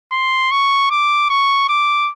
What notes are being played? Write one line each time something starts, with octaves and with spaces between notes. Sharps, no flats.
C6
C#6
D6
C#6
D6